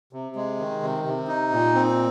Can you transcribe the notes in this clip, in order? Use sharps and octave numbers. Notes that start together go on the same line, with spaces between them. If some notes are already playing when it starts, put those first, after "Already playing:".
C3
G#3
D#3
C3
C3
D#4
A#2
C4